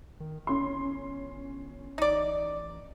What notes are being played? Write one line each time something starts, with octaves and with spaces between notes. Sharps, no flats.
D#3
G1 C#4 C6
A1 D#4 D5